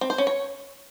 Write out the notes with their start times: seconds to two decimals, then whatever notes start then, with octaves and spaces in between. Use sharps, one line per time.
0.01 C4
0.10 C5
0.18 C#4
0.27 C#5